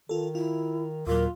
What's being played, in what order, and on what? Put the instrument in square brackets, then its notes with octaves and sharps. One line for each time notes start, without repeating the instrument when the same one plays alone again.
[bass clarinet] D#3 [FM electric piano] F4 A4
[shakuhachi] E4 [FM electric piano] F4
[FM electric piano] D#2 A#2 F#3 [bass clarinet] F4 [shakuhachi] A#4